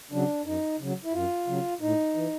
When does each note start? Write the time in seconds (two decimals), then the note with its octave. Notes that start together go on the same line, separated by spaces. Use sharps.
0.11 C#3 F#3 D4
0.45 F#2 D#4
0.79 C#3 F#3
1.05 E4
1.13 F#2 F4
1.47 C#3 F#3
1.81 A2 D#4
2.15 E3